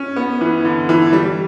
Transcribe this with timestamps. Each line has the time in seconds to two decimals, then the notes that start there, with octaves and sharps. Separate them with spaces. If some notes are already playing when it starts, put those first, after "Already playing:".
Already playing: C#4
0.16 B3
0.41 E3
0.65 D3
0.89 E3
1.13 G3